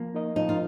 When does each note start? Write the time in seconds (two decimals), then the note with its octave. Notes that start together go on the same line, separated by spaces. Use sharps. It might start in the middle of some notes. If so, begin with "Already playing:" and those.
Already playing: F3 A#3
0.15 D#4 A#4 D#5
0.36 F3 D#4
0.49 F4